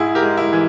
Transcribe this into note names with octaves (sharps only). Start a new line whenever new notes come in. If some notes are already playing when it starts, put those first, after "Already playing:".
Already playing: G#2 E4 G#4
G4 A#4
G#3
E4
E3